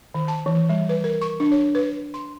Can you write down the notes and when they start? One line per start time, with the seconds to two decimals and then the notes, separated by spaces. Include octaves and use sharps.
0.14 D#3
0.28 A5
0.46 E3
0.69 G3
0.89 B4
1.04 A#4
1.22 C#6
1.40 D4
1.52 C#5
1.75 B4
2.14 C6